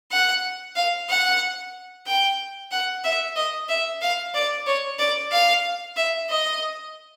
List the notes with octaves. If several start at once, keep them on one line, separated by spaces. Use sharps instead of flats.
F#5
F5
F#5
G5
F#5
E5
D#5
E5
F5
D5
C#5
D5
F5
E5
D#5